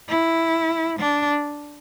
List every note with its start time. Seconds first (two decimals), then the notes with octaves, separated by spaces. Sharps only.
0.09 E4
0.99 D4